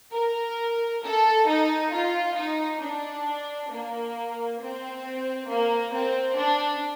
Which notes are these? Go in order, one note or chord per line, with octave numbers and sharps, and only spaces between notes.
A#4
A4
D#4
F4
D#4
D4
A#3
C4
A#3
C4
D4